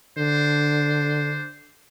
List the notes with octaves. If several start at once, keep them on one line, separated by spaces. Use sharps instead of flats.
D3 D4 C5